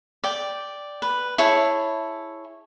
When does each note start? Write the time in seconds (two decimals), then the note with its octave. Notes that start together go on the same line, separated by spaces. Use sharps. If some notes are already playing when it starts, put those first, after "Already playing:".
0.24 D5 G5
1.02 B4
1.38 E4 G#4 C#5 A5